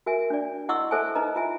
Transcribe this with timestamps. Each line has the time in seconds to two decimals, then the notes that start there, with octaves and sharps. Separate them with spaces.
0.06 F#4 A#4 E5 G#5
0.30 D4 D5
0.69 E4 D#5 F#5 C6 C#6 E6
0.91 A4 C5 E5 G#5 A5
1.15 D#4 B4 D#5 A#5
1.36 F4 E5 G#5